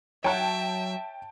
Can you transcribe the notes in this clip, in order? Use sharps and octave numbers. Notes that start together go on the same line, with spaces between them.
F#3 C#5 E5 F#5 G5 A5